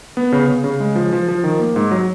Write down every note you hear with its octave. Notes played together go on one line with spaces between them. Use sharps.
B3
C#3
C#3
C#3
G#3
F3
F3
F3
D#3
A#3
G#2
F#3